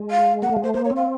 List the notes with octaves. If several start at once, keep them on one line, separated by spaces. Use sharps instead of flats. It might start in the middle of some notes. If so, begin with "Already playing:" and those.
Already playing: G#3
F5
A#3 F#5
A3
F5
G#3
A3 C5
A#3 C5
C#5
C4
F5